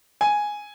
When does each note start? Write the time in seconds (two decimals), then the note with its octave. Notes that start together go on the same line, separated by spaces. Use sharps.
0.21 G#5